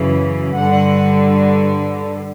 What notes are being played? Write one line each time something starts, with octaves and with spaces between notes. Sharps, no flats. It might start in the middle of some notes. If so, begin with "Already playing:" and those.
Already playing: F#2 C#3 E3
G2 D3 F#5